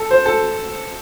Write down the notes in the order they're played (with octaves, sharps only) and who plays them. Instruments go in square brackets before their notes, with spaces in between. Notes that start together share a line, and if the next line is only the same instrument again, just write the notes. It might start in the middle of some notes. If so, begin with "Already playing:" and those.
Already playing: [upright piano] A4
C5
A4